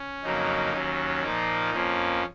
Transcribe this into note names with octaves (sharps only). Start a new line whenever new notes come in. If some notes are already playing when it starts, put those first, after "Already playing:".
Already playing: C#4
F2 C#3 F#3 A#3 D#4
D#2 D#3 F#3 C#4
A#2 F3 A#3 D#4
F2 F3 A#3 C#4